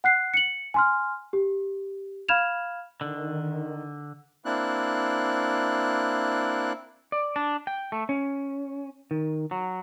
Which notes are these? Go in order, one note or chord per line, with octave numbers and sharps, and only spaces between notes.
F#5 F#6 C7
C#7 F#7
G#5 C6 F6
G4
F5 B5 F6 G#6 E7 F7
D3 D#3
A#3 C4 D4 E4 F#6
D5
D4
G5
A3
C#4
D#3
F#3